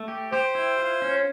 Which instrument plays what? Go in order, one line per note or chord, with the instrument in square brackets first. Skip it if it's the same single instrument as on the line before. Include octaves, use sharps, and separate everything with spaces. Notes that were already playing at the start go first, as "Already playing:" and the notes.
Already playing: [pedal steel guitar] A3
G4
[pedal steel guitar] G4 [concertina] C5
[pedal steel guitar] E4
F4
C#4